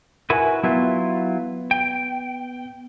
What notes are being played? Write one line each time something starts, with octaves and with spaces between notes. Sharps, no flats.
E4 F#4 A#4 B4 G#5
F#3 B3 E4 F4
G5